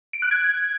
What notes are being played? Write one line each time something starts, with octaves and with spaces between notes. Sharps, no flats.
D7
F#6
G#6